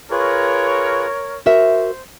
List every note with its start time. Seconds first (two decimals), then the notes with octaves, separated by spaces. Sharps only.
0.11 F4 G#4 A#4 B4 C#5
1.46 F#4 A#4 C5 E5